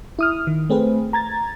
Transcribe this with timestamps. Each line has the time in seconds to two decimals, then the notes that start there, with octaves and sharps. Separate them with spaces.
0.19 E4 D#6 F6
0.47 D#3
0.70 A3 C4 G#4 B4
1.13 A#5 G#6 A6